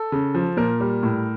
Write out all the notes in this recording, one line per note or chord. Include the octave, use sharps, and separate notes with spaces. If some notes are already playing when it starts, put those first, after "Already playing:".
Already playing: A4
C#3
F3
A#2 A#4
G3
A2